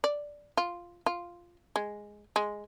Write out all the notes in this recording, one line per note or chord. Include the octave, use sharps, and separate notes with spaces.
D5
F4
F4
G#3
G#3